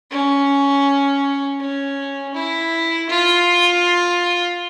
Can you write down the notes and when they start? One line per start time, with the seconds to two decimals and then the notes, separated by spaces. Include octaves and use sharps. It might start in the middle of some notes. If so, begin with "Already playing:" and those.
0.11 C#4
1.60 C#4
2.34 E4
3.09 F4